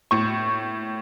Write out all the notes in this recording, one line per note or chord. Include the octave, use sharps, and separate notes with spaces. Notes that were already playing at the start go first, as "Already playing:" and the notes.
A2 C#6